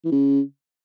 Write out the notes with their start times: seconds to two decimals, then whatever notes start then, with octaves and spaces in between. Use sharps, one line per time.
0.05 E3
0.12 C#3